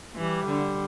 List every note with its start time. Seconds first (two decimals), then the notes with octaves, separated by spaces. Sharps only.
0.15 E3 G3
0.46 D3